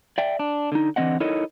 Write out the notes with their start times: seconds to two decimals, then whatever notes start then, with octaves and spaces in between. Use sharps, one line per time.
0.18 D5 E5 G5
0.39 D4
0.72 D3 D#4
0.96 D3 E3 F3 C4 D#5 F#5
1.20 D#4 E4 A4 A#4 C#5 D#5